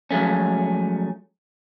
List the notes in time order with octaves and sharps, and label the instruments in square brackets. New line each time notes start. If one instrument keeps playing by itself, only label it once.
[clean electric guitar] F3 F#3 G#3 A3 C#4